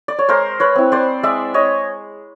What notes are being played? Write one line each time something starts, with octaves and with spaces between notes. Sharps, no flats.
D5
C#5
G#3 A#4 C5
B4 C#5
C4 E4
C5 D5
G#3 D5 E5
C#5 D#5